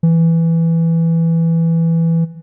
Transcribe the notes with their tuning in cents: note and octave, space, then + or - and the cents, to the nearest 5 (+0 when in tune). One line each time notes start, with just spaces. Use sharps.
E3 +5